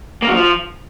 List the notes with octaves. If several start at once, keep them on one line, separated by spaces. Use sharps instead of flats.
A#3
F#3
F3